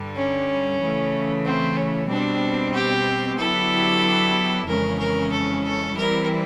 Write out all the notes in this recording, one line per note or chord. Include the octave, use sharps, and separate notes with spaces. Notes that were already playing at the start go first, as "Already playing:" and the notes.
Already playing: G2 D3 G3
C#4
C#3 E3 A3
C4
C#4
B2 G3 C4 D4
G4
D3 F#3 B3 E4 G4 A4
F2 C#3 E3 G#3 C#4 A#4
A#4
A4
A4
E3 G3 C4 E4 A#4